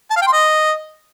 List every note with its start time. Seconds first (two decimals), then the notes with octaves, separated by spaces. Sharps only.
0.11 A5
0.16 F5
0.22 G5
0.27 C6
0.33 D#5